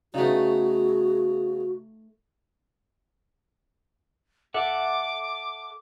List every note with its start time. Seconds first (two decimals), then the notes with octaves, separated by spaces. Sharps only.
0.14 C#3 A3 B3 D#4 F#4 G#4
4.54 A4 E5 F#5 D6